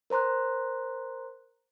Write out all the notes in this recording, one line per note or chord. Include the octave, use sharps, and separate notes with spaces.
A#4 C5 A#5 C6 F#6